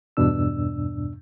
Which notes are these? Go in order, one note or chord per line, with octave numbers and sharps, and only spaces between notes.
E2 G2 B2 D4 E6